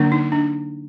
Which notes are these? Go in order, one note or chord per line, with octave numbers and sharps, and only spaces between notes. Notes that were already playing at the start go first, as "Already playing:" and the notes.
Already playing: D3 F#3 A#3 D4
D#4
D4